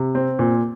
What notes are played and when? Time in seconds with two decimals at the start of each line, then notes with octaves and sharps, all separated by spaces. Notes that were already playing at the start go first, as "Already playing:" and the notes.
Already playing: C3
0.15 C4
0.39 A#2